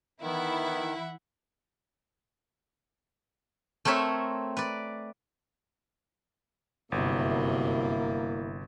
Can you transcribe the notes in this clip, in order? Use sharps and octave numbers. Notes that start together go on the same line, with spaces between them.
D#3 E3 B3 E4 E5 F#5
A3 C4 A#4 C#5 E5
B4 D5
G1 F#2 C3 A#3 E4